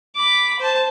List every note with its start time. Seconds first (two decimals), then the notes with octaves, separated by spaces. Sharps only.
0.16 B5 D6
0.59 C5 A5